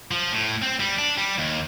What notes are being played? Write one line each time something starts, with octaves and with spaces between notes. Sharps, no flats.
F3
A2
C4
G3
D4
G3
D#2